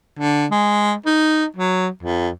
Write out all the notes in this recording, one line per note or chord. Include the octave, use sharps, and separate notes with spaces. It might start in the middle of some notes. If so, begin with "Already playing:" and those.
D3
G#3
D#4
F#3
F2